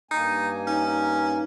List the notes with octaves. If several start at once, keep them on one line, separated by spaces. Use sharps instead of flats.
G2 A#3 D#4 G#5
C#4 D#4